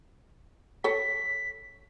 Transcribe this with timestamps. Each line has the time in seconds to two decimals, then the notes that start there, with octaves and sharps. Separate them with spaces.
0.84 A4 C#5 B6